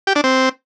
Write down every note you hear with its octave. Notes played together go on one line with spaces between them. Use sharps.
G4
D4
C4